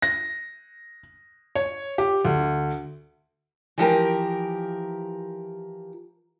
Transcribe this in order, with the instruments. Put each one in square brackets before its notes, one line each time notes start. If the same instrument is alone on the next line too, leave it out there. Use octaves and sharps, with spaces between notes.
[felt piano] A#6
C#5
G4
D2
[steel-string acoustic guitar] E3 F3 G4 A#4